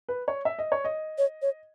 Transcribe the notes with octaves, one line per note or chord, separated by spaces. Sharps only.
B4
C#5
E5
D#5
C#5
D#5
C#5
C#5